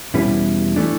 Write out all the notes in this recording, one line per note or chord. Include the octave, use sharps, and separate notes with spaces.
E2 B2 G3 C#4 E4 B4
E3 A3 D4